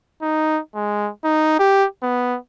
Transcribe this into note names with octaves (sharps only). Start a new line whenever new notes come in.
D#4
G#3
D#4
G4
B3